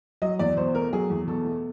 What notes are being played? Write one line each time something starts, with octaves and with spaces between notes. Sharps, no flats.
F#3 D#5
E2 D5
B2 C5
A3 A#4
F#3 G#4
E2
B2 A4
A3